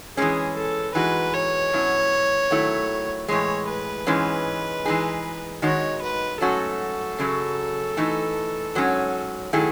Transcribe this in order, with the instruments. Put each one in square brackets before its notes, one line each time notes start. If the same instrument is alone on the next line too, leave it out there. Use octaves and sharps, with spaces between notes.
[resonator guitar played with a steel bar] E3 G#3 C#4 [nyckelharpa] G#4
[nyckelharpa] A4
[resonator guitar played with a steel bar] E3 G#3 D#4 F#4 [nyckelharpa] B4
[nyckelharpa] C#5
[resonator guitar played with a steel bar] B2 F#3 C#4 E4
D#3 F#3 A3 E4
[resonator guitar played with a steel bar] A2 E3 G#3 [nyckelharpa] C#5
[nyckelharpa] B4
[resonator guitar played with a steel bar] G#2 E3 G#3 C#4
E3 G#3 D#4 G#4
[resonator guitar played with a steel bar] D#3 G#3 D#4 F#4 [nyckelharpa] C#5
[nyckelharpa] B4
[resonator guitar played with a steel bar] G#2 F#3 A3 C#4 F#4 [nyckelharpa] A4
[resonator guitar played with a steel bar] F#2 C#3 F#3
E3 A3 D#4
G#2 F#3 C#4
D#3 F#3 A3 E4 G#4